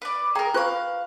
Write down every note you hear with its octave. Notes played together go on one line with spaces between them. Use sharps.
B4 D5
G#4 A#4 G5 A#5
F4 B4 F5 C#6 F#6